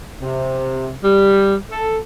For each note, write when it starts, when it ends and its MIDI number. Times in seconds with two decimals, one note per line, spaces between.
0.22 0.92 48
1.03 1.55 55
1.70 1.97 69